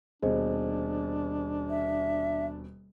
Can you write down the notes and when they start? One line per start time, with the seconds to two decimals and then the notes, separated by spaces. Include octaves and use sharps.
0.23 D#1 B2 D4 G#4 C5 D#5
1.70 E5